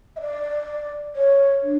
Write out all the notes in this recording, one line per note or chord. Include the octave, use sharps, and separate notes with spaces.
E5
D5
C#5
D4